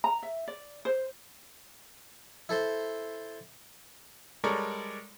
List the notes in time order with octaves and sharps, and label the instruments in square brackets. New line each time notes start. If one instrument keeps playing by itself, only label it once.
[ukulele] A#5
E5
D5
C5
[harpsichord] E4 A4 C5 C6
[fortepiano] G3 G#3 A4 A#4 C#5 D5